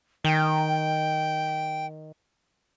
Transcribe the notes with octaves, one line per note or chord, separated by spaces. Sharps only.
D#3 G5